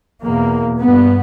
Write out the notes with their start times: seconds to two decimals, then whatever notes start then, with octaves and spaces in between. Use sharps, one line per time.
0.23 E2 B2 A#3
0.80 G2 B3